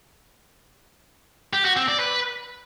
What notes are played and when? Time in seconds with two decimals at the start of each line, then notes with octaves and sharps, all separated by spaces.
1.53 G4
1.65 F#4
1.76 C4
1.88 D5
2.00 B4